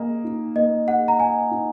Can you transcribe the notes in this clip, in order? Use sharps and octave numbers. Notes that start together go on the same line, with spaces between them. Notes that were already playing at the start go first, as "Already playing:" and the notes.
Already playing: A#3 G#4 D#5
D#4
A#3 D#5
G#4 F#5
A#5
D#5 G#5
D#4